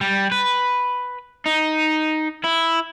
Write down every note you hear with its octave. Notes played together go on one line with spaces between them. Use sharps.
G3
B4
D#4
E4